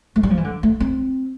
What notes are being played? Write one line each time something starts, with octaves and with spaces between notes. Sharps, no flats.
A3
G3
F3
E3
D3
A3
C4